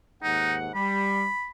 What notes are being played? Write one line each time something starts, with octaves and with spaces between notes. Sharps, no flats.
D#2 G#2 D#4 F#5
G3 B5